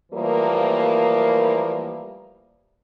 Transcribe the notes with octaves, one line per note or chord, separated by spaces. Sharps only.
E3 F3 G3 A3 A#3